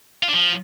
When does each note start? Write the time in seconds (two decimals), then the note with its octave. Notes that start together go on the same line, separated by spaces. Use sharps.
0.23 F4
0.28 D4
0.34 F3